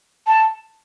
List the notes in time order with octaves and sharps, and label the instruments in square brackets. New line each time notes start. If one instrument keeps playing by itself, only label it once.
[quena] A5